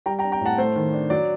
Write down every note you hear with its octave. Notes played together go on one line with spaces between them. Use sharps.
G3 G5 A#5
G5 A#5
D4
G5 A#5
A2 F#5 A5
A3 C5
D#3
D4
F#3 D5